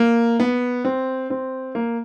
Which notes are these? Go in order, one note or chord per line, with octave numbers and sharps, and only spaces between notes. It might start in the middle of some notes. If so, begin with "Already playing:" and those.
Already playing: A#3
B3
C4
C4
A#3